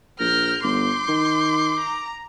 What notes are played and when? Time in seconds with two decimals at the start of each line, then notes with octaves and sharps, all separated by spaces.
0.20 A#1 A#4 F6 G6
0.64 G1 C6 D6 G6
1.09 D#3
1.81 A#5